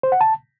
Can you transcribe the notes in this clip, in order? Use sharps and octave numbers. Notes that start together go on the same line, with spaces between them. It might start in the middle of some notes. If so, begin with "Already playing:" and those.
C5
F#5
A5